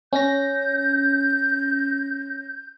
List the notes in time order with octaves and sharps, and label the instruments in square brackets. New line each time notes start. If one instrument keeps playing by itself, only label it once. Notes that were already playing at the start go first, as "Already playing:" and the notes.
[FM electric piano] C#4 A#6 [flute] G6